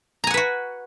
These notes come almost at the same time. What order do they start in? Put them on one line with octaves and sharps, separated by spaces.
A#5 G#5 F#5 B4 F#4